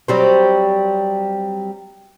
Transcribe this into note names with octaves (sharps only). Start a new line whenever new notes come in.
F#3 G3 C4